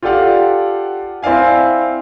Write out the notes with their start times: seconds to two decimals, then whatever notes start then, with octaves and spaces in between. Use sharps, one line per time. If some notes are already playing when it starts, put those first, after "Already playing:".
0.03 F4 G4 A4 D5 F5 F#5
1.23 C4 E4 D5 F5 G#5